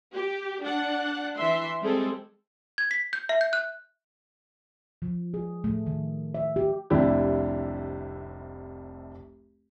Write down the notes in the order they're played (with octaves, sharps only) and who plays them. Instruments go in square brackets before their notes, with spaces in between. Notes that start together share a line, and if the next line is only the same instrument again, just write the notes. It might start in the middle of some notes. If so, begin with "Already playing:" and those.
[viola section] G4
D4 F#5
E3 E5 C6
G3 G#3 C4 G#4 A4
[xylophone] G#6
B6
G6
E5
G6
F#6
[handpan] F3
G#4
A3
D#3
E5
G4
[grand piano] F1 C2 C3 D4 E4 G4